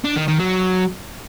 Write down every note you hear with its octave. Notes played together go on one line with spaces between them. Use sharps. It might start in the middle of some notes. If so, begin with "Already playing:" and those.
D4
D#3
D#3
F#3